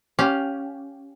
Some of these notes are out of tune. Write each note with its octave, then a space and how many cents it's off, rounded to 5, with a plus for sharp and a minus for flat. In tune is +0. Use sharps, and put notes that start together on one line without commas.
C#4 +0 G4 -10 F5 +10